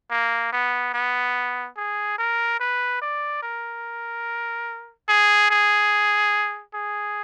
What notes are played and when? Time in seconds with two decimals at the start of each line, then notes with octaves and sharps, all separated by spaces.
0.10 A#3
0.52 B3
0.94 B3
1.77 G#4
2.18 A#4
2.60 B4
3.01 D5
3.43 A#4
5.08 G#4
5.50 G#4
6.74 G#4